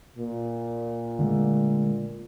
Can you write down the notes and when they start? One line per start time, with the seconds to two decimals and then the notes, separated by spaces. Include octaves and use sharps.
0.18 A#2
1.19 D3 G#3 A3